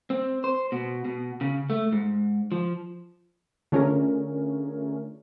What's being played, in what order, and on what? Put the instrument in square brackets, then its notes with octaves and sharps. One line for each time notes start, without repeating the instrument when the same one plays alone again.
[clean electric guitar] C4
C5
B2
B2
C#3
A3
G#2
F3
[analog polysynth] D3 A3 C#4 F4 G#4 A#4